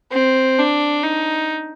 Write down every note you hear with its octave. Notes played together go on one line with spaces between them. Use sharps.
C4
D4
D#4